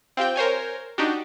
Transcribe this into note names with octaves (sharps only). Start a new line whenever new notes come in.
C4 F4 G4 G5
A#4 C5 C#5 G#5
D4 D#4 F#4 G4